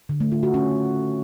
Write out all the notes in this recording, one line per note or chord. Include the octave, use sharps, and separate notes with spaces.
D3
A3
F4
F#4
C#4